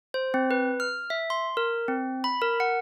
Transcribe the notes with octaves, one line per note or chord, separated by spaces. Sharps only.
C5
C4
B4
F6
E5
C6
A#4
C4
B5
A#4
F#5